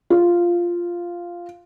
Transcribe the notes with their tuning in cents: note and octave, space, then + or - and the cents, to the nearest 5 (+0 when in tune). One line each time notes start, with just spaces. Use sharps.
F4 -5